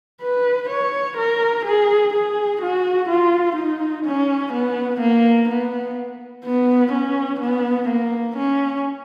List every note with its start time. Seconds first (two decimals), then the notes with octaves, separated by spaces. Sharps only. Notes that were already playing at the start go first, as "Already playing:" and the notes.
0.22 B4
0.69 C#5
1.17 A#4
1.65 G#4
2.13 G#4
2.62 F#4
3.09 F4
3.56 D#4
4.05 C#4
4.53 B3
5.01 A#3
5.49 B3
6.44 B3
6.92 C#4
7.41 B3
7.88 A#3
8.37 C#4